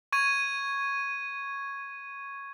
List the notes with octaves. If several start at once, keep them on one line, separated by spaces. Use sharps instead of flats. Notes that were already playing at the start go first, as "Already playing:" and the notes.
C#6 G#6 D#7